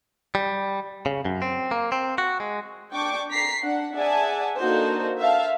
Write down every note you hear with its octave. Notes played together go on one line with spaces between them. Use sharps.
G3
C#3
F#2
C4
A#3
C4
F#4
G#3
D4 G5 C#6 D6
A#5 B6 C7
D4 F#5
G#4 D5 E5 F#5 G#5 A5
A#3 D4 D#4 F#4 A4 C5
E5 F5 A5